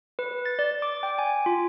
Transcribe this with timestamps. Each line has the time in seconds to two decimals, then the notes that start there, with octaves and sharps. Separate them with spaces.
0.19 B4
0.46 A6
0.59 D5
0.82 D6
1.03 G5
1.19 G#5
1.46 F4